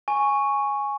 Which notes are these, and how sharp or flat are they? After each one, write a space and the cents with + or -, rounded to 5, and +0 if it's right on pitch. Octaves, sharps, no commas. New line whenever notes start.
G#5 +0 C#6 +0